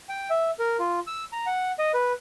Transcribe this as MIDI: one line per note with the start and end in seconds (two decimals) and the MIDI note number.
0.09 0.30 79
0.30 0.51 76
0.59 0.77 70
0.79 1.00 65
1.07 1.24 88
1.32 1.46 82
1.46 1.72 78
1.79 1.92 75
1.94 2.12 71